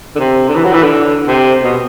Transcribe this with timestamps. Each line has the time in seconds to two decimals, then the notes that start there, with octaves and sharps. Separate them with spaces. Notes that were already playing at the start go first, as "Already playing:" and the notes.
0.16 D3
0.20 C3
0.48 D3
0.56 E3
0.65 F#3
0.73 E3
0.83 D3
1.27 C3
1.63 B2